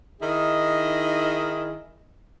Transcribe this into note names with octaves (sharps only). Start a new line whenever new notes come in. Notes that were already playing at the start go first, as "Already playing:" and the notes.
D#3 D#4 E4 G#4 D#5